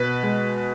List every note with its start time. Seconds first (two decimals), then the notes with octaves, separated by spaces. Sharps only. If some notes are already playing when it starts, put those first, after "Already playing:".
Already playing: B2 B4
0.23 G#3